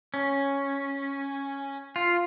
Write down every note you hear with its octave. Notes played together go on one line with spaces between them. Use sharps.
C#4
F4